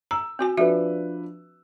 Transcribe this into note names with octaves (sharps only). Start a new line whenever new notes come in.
A#5 E6
C4 F#4 G#5
F3 D4 F#4 B4 E5